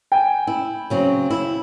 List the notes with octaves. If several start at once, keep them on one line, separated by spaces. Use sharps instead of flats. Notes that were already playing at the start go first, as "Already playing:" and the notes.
G5 G#5
E4
C#3 F#3 C4
E4